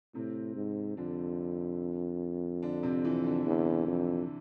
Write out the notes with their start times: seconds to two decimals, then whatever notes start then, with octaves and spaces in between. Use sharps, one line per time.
0.15 A2 C3 C4
0.55 G#2
0.97 F2 D3 D4
2.62 D3 D4
2.83 C3 C4
3.05 E3 E4
3.24 D3 D4
3.46 E2
3.87 F2